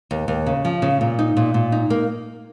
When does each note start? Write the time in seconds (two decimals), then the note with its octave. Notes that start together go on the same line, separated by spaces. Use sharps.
0.11 D#2
0.28 D#2
0.47 C#3
0.65 F3
0.82 C#3
1.01 A#2
1.19 D#4
1.37 A#2
1.54 A#2
1.72 D#4
1.90 A#3